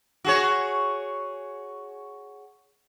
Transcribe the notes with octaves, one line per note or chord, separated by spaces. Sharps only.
F#4 G#4 C#5